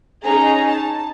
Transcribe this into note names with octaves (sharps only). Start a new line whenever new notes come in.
C#4 D#4 G#4 A#5
A5